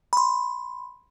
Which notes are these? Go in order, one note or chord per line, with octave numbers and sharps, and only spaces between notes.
B5 C6